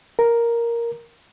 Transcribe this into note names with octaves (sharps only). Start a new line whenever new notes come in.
A#4